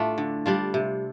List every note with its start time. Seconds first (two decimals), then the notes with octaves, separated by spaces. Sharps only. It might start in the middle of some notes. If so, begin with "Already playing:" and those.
Already playing: A2 A3 D4 F4
0.18 D3
0.46 G3 D4 F4
0.74 C3